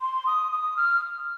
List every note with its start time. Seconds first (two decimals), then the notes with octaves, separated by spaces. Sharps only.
0.01 C6
0.27 D#6
0.52 D#6
0.77 F6